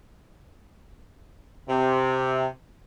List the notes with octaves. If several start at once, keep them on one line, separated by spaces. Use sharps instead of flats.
C3